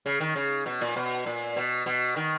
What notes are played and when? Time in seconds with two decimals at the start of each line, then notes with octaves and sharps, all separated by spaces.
0.06 C#3
0.20 D#3
0.36 C#3
0.66 B2
0.81 A#2
0.96 B2
1.26 A#2
1.56 B2
1.86 B2
2.16 D#3